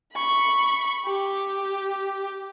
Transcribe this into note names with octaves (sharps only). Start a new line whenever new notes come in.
B5 C#6
G4